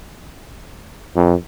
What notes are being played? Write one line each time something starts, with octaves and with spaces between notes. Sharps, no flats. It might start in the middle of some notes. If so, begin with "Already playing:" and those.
F2